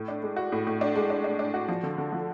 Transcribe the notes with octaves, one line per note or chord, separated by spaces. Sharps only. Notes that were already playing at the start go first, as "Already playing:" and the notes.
Already playing: A2
D4
G#3
F#4
A2
A2
D4
G#3
D4
D4
D4
F#4
F3
D3
D3
F3